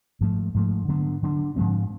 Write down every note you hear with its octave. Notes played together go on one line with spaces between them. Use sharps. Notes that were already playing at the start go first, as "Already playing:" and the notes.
G#2 F3 A3
G#2 F3 A3
D3 F#3 B3 D4
D3 F#3 B3 D4
G#2 F3 G#3 C4